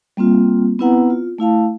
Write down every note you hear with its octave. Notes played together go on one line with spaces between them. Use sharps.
G3 A#3 C4 F4
B3 C4 E4 B4 F#5 A#5
F4
A3 E4 F5 A5